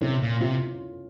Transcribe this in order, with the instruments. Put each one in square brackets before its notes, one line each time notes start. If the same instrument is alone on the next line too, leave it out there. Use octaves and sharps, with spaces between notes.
[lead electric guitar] C3 [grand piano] C#4
[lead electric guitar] A#2
[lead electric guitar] C3 [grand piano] F4